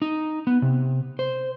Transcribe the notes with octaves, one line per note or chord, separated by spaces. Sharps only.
D#4
B3
C3
C5